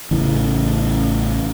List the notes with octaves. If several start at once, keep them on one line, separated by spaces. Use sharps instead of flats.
A1 C#3 E3